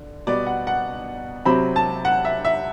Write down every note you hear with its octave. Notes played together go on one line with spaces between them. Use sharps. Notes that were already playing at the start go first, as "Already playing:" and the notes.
Already playing: D3
B2 G3 B3 D5
F#5
F#5
C3 F#3 C4 B5
A5
F#5
E5
E5